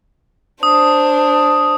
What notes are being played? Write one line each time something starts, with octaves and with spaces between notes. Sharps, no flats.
D4 C5 D#6